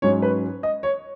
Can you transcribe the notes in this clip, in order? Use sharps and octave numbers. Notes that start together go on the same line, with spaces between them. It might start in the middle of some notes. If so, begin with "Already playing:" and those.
G#2 F#3 C#4 C#5
B4
D#5
C#5